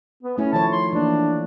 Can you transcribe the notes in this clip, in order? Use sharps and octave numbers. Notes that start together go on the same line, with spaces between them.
B3
A3 C#4 E4
D#3 F3 C#5 A5
C6
E3 A#3 D4